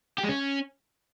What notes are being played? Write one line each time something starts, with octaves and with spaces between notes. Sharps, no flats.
G4
G#3
C#4